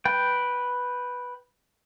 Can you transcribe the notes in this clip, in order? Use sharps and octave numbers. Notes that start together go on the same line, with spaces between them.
B4 G5